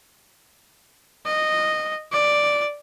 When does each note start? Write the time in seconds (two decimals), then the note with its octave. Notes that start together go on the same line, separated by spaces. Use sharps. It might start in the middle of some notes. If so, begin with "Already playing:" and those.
1.26 D#5
2.13 D5